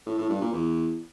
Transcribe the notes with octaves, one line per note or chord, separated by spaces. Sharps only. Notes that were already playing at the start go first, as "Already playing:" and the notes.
A2
A2
G2
A#2
E2